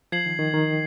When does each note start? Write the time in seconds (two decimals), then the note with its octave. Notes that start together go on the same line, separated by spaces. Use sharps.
0.12 F3 G#6 C7 F#7
0.26 D#3
0.39 D#3
0.54 D#3